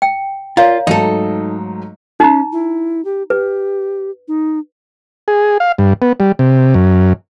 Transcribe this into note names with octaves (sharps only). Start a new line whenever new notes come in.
G5
F4 A#4 C#5 D5 F5 A#5
G#2 F#3 A3 D#4 A4
C#4 D#4 A#5
E4
G4
G4 B4
D#4
G#4
F5
G2
B3
G3
C3
F#2